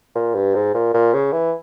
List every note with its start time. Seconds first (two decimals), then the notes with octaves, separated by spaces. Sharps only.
0.15 A#2
0.35 G2
0.55 G#2
0.74 A#2
0.94 A#2
1.14 C#3
1.32 E3